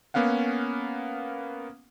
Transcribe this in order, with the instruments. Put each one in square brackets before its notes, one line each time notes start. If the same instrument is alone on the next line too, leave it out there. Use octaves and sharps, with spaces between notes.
[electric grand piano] A#3 B3 C#4 F5 F#5